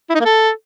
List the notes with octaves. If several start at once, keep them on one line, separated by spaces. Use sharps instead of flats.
E4
D#4
A#3
A4